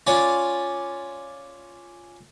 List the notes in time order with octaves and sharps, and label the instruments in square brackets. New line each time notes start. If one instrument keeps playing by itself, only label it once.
[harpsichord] C#4 F4 D5